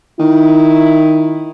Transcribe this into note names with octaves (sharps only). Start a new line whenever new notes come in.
D#3 E4